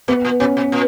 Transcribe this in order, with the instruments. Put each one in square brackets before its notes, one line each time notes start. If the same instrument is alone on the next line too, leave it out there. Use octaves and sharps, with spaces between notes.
[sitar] B2 [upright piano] B3
[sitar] A#2
[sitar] B2 [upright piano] C#4
[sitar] B2
A#2